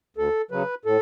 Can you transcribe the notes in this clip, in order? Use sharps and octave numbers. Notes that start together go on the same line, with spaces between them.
D2 A4
C#3 F#3 B4
A2 A4